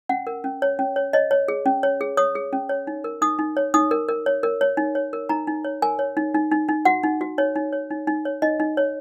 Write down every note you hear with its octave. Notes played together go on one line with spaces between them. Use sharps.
C#4 F#5
A#4
C#4
C#5
C#4
C#5
C#5 D#5
C#5
G#4
C#4
C#5
G#4
C#5 D#6
G#4
C#4
C#5
D#4
A#4
D#4 D#6
D#4
C#5
D#4 D#6
A#4
A#4
C#5
A#4
C#5
D#4
C#5
A#4
D#4 A#5
D#4
C#5
A#4 G#5
C#5
D#4
D#4
D#4
D#4
F#4 F#5
D#4
F#4
D#4 C#5
D#4
C#5
D#4
D#4
C#5
D#4 D#5
D#4
C#5